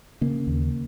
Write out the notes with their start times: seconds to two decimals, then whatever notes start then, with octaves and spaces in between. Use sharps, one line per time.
0.21 C#3 A#3
0.47 D#2